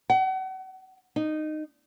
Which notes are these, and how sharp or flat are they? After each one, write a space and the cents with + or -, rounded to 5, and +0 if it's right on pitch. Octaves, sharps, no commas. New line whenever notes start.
F#5 +35
D#4 -15